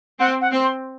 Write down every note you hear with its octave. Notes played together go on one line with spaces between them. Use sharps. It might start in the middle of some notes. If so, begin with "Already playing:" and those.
C4 F#5
F#5
C4
C6